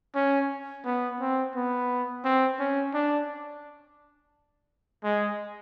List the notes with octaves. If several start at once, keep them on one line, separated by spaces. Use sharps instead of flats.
C#4
B3
C4
B3
C4
C#4
D4
G#3